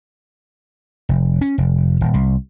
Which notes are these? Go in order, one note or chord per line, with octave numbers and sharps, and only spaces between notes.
F1
C#4
F1
D#1
C2